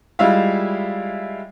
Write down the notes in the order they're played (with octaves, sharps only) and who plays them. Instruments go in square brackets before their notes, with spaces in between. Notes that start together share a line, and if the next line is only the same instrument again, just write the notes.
[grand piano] G3 G#3 E4 F4 E5 F5